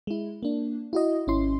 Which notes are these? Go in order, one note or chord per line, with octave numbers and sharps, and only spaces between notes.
G#3 E4
A#3 D4
E4 F#4 D#5
G#1 C#4 E4 C6